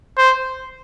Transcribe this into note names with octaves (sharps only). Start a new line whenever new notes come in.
C5